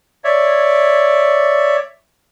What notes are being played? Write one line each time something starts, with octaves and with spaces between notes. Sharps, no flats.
C#5 D5 E5